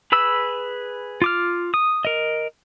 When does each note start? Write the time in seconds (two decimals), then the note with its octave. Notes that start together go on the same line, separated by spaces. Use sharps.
0.12 G#4 B4 B5 E6
1.22 F4 D6 F6
1.74 D#6
2.05 A#4 D#5